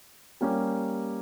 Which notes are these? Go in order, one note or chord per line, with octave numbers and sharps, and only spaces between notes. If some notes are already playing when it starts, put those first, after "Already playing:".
G3 A#3 C#4 G4